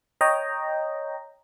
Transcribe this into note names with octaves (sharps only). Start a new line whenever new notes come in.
C#5 D#5 G5 A#5